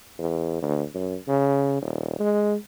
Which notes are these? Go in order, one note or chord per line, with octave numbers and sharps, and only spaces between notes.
E2
D2
F#2
C#3
D#1
G#3